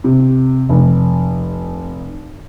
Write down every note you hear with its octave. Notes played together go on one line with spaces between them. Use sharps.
C3
F1